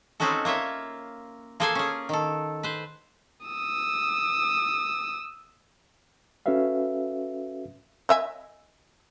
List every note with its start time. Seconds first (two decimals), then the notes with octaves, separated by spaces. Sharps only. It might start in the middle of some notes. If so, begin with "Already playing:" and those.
0.20 G#3 C4 C#4 D#4 F#4 A4
0.45 A#3 F4 C#5 E5
1.60 A#3 F4 G#4 A4 C5 G#5
1.75 C#4 G#4
2.09 D#3 A4
2.63 B4 C5
3.46 D#6 E6
6.46 C#4 F#4 A4 B4 E5 F5
8.09 D#5 E5 G#5